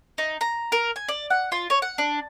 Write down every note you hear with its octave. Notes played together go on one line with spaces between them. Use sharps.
D#4
A#5
A#4
G#5
D5
F#5
F4
C#5
F#5
D4